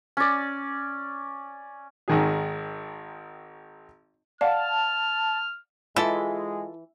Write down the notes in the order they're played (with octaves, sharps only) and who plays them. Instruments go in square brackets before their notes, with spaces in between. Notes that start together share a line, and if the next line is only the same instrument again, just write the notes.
[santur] C#4 D5
[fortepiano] G#1 D#3 G#4
[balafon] D5 F5 F#5 [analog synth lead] A5 [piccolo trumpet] F6
[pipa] E3 [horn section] G#3 [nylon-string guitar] F4 [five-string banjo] A4 E5